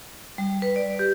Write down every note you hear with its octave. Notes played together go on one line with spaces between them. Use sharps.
G3
B4
D5
G4